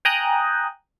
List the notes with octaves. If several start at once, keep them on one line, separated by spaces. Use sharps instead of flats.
G5 G#5 A#5 D#6 F#6 G6